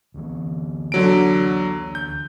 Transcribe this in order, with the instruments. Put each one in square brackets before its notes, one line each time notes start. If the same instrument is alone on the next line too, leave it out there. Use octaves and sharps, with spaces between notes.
[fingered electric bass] D2 E3
[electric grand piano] D3 F#3 D7
G6